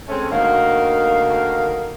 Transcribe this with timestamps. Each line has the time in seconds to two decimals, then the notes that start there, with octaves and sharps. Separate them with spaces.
0.09 G#3 A3 C4 C#4
0.30 D2 D#3 A#3 F#4 F5